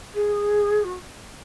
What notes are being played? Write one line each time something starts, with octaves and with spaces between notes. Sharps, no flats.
G#4
F#4